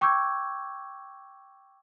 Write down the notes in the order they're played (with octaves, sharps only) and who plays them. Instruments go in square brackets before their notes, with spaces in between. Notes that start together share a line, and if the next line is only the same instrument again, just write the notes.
[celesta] G5 C#6 D6 E6 G6 G#6